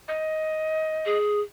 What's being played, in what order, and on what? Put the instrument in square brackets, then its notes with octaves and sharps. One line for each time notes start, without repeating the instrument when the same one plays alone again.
[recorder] D#5
[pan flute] G#4